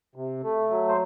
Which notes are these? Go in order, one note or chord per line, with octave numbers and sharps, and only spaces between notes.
C3
A3
F#3
C5